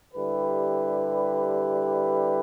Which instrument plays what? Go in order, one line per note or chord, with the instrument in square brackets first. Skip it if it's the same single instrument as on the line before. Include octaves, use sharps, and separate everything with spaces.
[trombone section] D3 G3 E4 G4 B4